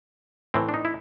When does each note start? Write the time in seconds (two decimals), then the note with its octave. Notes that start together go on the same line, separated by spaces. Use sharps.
0.54 A2 E3 C4
0.69 D4
0.74 D#4
0.85 E4